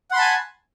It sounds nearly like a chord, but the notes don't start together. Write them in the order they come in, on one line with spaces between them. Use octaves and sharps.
F#5 C6 B5 A5 G#5